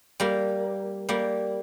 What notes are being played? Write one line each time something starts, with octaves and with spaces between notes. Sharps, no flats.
G3 A#3
G3 A#3